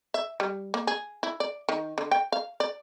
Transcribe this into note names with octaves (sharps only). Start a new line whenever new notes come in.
E5
G3
A#3
G#4
E4
D5
D#3
D3
G5
F5
D5